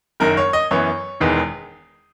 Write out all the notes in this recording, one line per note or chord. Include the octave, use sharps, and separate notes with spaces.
F#1 F#2 D#3 A#4
C#5
D#5
F#2 E3 B3 C#5
E1 E2 D#3 G#3 B3